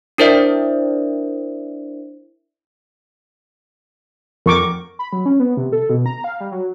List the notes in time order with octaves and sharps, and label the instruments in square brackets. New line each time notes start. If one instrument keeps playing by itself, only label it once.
[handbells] D4 E4 A#4 C5 D5 E5
[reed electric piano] F2 [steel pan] A#4 C#6 D6
[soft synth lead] B5
F#3
C#4
B3
C3
A4
B2
A#5
F5
G3
F#3